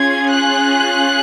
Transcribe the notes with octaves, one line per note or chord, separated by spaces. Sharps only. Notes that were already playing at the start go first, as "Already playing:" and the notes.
Already playing: C#4 F4 G#4 G#6
F#6